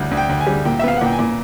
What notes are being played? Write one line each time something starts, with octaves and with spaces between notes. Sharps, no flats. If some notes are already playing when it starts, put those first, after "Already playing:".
Already playing: D2 G3
D2
G5
D2
G#5
G3
A#2 G5
E5
B3 F5
F#5
A#2 G5
G#5
A#2